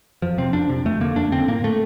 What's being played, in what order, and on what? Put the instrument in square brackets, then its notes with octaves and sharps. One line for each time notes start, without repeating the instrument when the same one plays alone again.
[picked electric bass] F2 F3
C3 C4
F2 D4
C3
F2 A3
D3 A#3
F2 D4
D3 C4
A2 A#3
A3